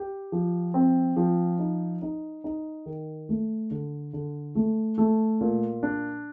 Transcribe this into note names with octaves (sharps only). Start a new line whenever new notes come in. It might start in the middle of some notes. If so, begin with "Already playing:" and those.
Already playing: G4
F3
C4
F3
D#4
D#4
D#4
D#3
A3
D3
D3
A3
A3
A#2
D4